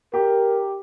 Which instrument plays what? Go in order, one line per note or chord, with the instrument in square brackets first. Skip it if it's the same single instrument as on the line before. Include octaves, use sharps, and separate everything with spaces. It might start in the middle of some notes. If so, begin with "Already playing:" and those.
[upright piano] G4 [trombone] A#4